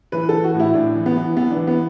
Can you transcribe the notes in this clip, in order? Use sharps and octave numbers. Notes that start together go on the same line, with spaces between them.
E3 B4
E3 A4
F#4
A2
E4
A2 D4
E3
B3
E3
E3 B3
D4
E3
B3